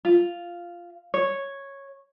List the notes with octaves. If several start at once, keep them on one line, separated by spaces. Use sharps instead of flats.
F4
C#5